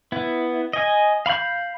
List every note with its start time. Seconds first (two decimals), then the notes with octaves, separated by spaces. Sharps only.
0.12 B3 E4
0.73 D#5 G#5
1.26 F5 B5 C#6 G6